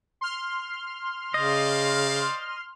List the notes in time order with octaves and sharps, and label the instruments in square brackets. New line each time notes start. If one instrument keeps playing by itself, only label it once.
[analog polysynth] C6 F6
[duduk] C#3 [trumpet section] C5 D5 F5 [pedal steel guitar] D#5